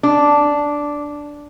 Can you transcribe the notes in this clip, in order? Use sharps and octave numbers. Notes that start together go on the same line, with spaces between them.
D4